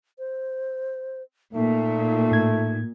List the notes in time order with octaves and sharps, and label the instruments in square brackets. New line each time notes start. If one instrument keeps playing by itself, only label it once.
[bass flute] C5
[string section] A#2 [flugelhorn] A3 [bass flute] D#4
[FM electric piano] A2 G#6